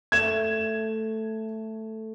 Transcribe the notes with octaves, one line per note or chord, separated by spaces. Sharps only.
A3 G#6 E7